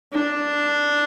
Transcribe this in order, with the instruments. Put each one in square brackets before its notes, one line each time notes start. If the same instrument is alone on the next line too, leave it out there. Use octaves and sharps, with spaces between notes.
[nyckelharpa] D4